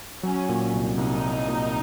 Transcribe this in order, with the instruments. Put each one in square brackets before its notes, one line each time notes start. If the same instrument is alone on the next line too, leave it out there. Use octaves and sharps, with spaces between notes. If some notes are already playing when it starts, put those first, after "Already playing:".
[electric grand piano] F#3 [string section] C#4
[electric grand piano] A#2
C2
[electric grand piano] C2 [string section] D#4
[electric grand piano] F#3
A#2